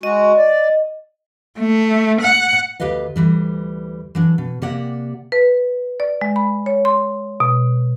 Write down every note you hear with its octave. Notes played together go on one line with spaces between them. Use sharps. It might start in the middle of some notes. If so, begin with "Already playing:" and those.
G#3 F#4 D#5
D5
A3
F#5
D2 G4 B4 D#5 F5
D2 E3 G3
E3 F#3 D4
B2
C3 A#3 G4 D5 F#5
B4
D5
G#3
B5
C#5
C6
B2